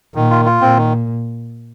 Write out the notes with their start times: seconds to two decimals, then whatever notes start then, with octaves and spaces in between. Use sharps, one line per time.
0.15 A#2 D#3
0.30 F4
0.45 F4
0.61 A#2 C4
0.77 D#3